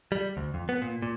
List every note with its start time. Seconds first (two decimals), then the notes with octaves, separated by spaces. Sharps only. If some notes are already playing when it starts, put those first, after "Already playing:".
0.12 G3
0.37 D2
0.54 F2
0.69 B3
0.82 A#2
1.02 A#2